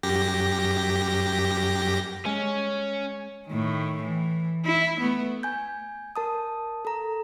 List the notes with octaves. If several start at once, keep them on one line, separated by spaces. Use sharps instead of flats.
F#2 G4 A#6
G#3 C#4
A2 D#3
E3
E4
A3 B3
G#5 G6
A#4 A5 D#6
A4 A#5